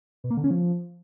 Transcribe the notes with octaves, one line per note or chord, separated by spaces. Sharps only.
B2
A#3
D3
C#4
F3